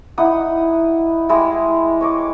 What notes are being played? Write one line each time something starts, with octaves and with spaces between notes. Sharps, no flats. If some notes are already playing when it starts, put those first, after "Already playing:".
D#4 E4 F#5 D#6
G3 G#3 E4
C#5 D#5 D6